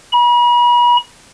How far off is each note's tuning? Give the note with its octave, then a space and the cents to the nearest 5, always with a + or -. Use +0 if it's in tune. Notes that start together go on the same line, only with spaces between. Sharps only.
B5 -40